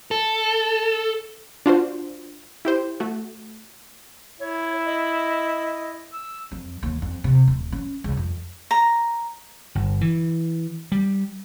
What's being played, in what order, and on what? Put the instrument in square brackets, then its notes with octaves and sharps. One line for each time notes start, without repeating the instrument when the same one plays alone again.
[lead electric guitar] A4
[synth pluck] D4 F4 F#4 C5
E4 G4 C5
A3 F#4
[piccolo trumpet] E4 [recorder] C#5
[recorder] D#5
[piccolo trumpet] E6
[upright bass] F2
D#2
F2
C3
D#1
C#4
C#2
F2
[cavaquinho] A#5
[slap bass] G1
E3
G3